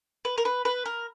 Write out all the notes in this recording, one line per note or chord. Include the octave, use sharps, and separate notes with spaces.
B4
A#4
B4
B4
A#4